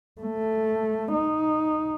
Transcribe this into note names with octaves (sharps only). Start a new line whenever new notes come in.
A3
D#4